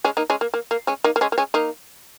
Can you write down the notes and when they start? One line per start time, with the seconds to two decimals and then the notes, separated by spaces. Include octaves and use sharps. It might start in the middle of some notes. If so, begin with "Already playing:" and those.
0.04 G#3 C#4
0.17 A#3 D#4
0.30 G#3 C#4
0.41 A#3
0.54 A#3
0.71 A#3
0.87 G#3 C#4
1.04 A#3 D#4
1.16 A#3
1.21 G#3 C#4
1.32 A#3
1.38 G#3 C#4
1.54 A#3 D#4